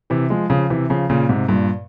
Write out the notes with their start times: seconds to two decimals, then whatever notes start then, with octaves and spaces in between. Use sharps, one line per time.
0.10 C3 E3
0.30 F3 G#3
0.50 C#3 F3
0.70 C3 E3
0.90 C#3 F3
1.10 A#2 C#3
1.29 G#2 C3
1.49 G2 A#2